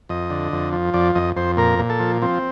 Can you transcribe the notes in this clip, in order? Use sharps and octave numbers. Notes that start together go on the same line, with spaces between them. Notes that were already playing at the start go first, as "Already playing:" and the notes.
F2 D#5
D3
F2
F3
F2 D5
F2 D#5
F2 C5
A#2 A#4
A#2
A4
F3
F3 C4